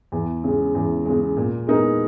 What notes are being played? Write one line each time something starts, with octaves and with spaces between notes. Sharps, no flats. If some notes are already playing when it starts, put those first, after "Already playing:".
E2
C#3 G#3
E2
C#3 G#3
A#2
G#3 B3 D#4 A#4